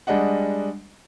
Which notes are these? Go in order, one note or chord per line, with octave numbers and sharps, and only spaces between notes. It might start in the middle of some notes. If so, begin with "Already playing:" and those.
G3 G#3 D4 D#5 F#5